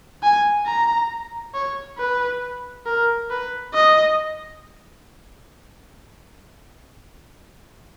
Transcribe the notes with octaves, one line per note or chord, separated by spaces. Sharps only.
G#5
A#5
C#5
B4
A#4
B4
D#5